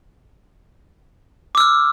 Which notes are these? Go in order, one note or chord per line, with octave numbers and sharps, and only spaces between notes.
D6 E6 F6